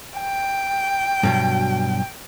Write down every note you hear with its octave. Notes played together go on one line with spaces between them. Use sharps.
G5
G2 B2 F#3